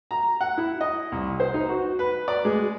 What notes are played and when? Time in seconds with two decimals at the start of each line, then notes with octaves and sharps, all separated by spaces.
0.11 A#5
0.41 F#5
0.58 E4
0.81 D#5
1.12 C2
1.40 C5
1.54 D#4
1.69 F#4
1.99 B4
2.28 D5
2.45 G#3